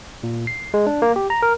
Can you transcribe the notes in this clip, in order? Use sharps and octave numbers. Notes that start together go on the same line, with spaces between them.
A#2
C7
G#3
D4
A#3
G4
A#5
A#4